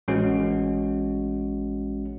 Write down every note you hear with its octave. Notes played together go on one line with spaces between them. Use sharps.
A1 G#3 C#4 F#4